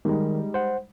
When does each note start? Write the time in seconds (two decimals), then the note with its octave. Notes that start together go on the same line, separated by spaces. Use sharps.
0.05 D#3 G3 G#3 D#4
0.54 C5 F#5